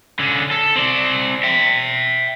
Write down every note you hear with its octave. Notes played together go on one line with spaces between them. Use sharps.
D3 C#4
A4
C4 D5
E5 G5